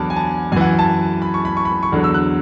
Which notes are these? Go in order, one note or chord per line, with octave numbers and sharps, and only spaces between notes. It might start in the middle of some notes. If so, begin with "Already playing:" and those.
Already playing: E2 D3 F#3 A5 B5 D6
G#5
A5
F#2 E3 F#5 G#5
A5
B5
C#6
B5
C#6
B5
C#6
E2 D3 F#3
E6
F#6